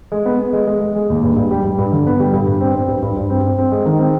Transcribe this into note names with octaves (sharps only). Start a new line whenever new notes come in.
G#3
B3
B3
G#3
G#3
G#3
G#3
D#2
G2
G2
G3
G3
G2
D3
B3
G3
G2
G2
C4
C4
G2
G2
G2
C4
C4
C4
G#3
D#3
C4